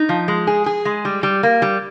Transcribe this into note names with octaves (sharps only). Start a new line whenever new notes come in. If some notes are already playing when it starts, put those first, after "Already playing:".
Already playing: D#4
F3
G#3
G#4
G#4
G#3
G3
G3
A#3
G3